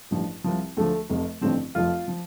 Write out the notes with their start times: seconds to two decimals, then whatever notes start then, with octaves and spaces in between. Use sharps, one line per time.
0.11 A1 G2 F3
0.44 C2 C3 F3
0.77 D2 D3 F3 A3
1.10 F1 F2 C3 F3
1.41 A1 G2 D3 F3 C4
1.75 F1 F2 F3 F4
2.08 F3